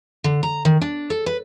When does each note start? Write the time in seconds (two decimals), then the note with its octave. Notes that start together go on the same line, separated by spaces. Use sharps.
0.24 D3
0.43 A#5
0.65 D#3
0.82 D4
1.10 A4
1.26 B4